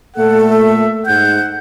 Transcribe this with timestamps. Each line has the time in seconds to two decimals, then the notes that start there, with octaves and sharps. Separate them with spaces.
0.16 A#2 A3 A4 F#5
0.51 E5
1.06 G#2 F#5 G6